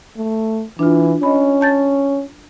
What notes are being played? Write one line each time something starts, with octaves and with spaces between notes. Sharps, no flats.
A3
E3 D4 F4
C#4 D#5 B5
A5 G6 A6